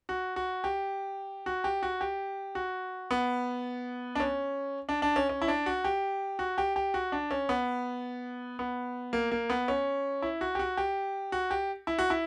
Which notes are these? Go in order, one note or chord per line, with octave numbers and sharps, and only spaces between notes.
F#4
F#4
G4
F#4
G4
F#4
G4
F#4
B3
D4
C#4
D4
D4
C#4
C#4
E4
D4
F#4
G4
F#4
G4
G4
F#4
D4
C#4
B3
B3
A#3
A#3
B3
C#4
E4
F#4
G4
F#4
G4
F#4
G4
E4
F#4
E4